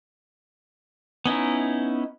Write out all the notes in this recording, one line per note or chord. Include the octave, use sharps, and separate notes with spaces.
B3 C#4 D#4 E4